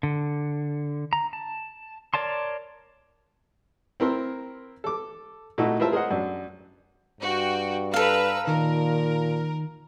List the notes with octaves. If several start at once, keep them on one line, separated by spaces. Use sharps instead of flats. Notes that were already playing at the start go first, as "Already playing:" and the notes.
D3
A#5
A5
A#4 C#5 D5 A5 C6
C4 E4 A#4 C6
A4 D6
A#2 A3 D#4 E4 F#4
E4 F4 A#4 C5 E5 A5
G#4 A#4 C5 D#5 F#5
F#2 D4
G2 F#4 G5
A4 B4 F5 A#5 E6
A#2 D#3 A#4